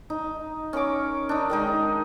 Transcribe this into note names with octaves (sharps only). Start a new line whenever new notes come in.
D#4
C#4 A#4 C#6 D6
D4 D#4
D#3 G#3 D#4